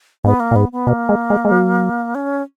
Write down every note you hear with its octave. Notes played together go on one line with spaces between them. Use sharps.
G#2 B3
A#3
A#2
G#2 B3
B3
B2 A#3
G#3
G#3
G#3
F#3
C#4